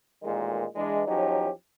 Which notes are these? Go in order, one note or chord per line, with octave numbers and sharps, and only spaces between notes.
A1 A#2 D#3 G#3
E3 G#3 D4
E2 F3 F#3 C#4 D#4 G4